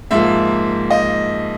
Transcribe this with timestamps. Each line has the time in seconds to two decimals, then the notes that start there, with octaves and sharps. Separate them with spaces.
0.11 G#2 F3 A#3 E5
0.90 D#5